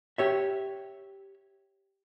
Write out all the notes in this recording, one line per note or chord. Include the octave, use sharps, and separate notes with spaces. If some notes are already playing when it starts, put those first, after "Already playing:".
G4 C#5 E5